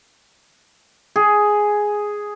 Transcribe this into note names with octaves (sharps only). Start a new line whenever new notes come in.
G#4